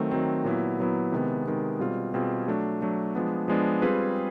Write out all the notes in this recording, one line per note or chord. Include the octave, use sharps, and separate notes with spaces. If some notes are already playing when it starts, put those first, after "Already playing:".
Already playing: D#3 F#3 A3 C4
D#3 F#3 A3 C4
A#2 F#3 B3 E4
A#2 F#3 B3 E4
C3 D#3 G#3 B3
C3 D#3 G#3 B3
B2 G3 C4 F4 G#4
B2 G3 C4 F4 G#4
F#3 A3 D4
F#3 A3 D4
F3 G#3 B3 D4
F3 G#3 B3 D4
G3 C4 F4 G#4 B4